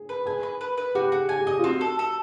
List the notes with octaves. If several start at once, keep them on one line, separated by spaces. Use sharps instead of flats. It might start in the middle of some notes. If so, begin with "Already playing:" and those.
Already playing: G#4
B4
G#4 G#5
B4
B4
B4
F#4 G4
F#4 G#4
G#4 G#5
G4
G#4 D#5
F4
C4 F#4
A4
A4